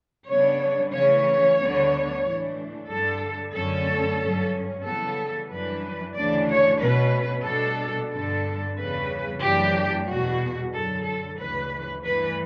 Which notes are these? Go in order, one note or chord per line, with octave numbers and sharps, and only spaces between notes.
C#3 G3 B3 D4 C#5
C#3 E3 A3 C#4 C#5
D2 D3 G3 B3 D4
A2 E3 A3 D4
G2 D3 G3 D4 A4
F#2 D3 A3 C#4 A4
G2 F#3 C#4
C#3 E3 G3 B3 A4
F#2 E3 G3 D4 B4
D2 C#3 E3 A3 D4 D5
C#5
B2 A3 C#4 B4
B2 G3 D4 A4
G2 D3 G3 B3 D4 A4
E2 C#3 G3 B4
F#2 E3 A3 D4 G4
E2 B2 G3 F#4
F#2 D3 F#3 A4
A4
D2 C#3 E3 B4
G2 E3 A3 B4